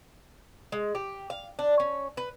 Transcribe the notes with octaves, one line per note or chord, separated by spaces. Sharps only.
G#3
G4
F5
D4
C#4
B4